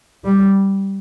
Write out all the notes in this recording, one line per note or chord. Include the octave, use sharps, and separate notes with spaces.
G3